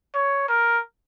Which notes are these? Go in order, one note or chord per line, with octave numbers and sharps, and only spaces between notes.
C#5
A#4